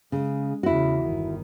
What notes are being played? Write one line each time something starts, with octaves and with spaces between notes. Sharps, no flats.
C#3 G#3
E2 C#3 E4 F#4
G1 D#3